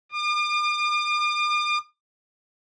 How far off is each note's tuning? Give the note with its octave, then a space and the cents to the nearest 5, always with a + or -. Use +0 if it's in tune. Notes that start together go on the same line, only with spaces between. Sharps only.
D6 +45